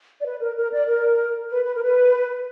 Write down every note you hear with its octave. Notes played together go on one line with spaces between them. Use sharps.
D5
B4
A#4
A#4
D5
A#4
B4
B4
A#4
B4